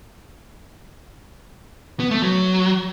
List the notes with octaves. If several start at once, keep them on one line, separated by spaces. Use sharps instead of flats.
B3
A3
F#3